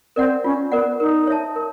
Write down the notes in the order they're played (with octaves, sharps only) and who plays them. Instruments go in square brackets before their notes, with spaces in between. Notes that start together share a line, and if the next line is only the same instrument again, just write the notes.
[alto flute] C4 [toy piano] A#4 D5 F#5
[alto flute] C#4 [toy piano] F4
[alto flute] B3 [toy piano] A#4 D5 F#5
[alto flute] D#4 [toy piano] A#4
[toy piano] C#5 E5 A5
A#4